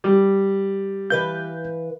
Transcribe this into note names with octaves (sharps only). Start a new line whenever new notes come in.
G3
E3 B4 F5 G6